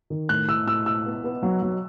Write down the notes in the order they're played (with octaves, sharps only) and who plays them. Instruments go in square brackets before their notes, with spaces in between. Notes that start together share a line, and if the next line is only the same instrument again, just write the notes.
[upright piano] D#3
[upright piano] A2 [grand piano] F#6
[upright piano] E4 [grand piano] E6
[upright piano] A2 [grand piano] E6
[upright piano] E4 [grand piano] E6
[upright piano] B3
B3
F#3
F#3